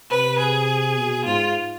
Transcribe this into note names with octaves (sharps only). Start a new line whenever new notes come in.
C3 B4
G#4
B2
G#2 F4